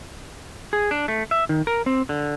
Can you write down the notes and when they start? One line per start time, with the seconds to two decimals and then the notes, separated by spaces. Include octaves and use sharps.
0.73 G#4
0.91 D4
1.08 A3
1.31 E5
1.49 D#3
1.67 A#4
1.86 C4
2.09 D3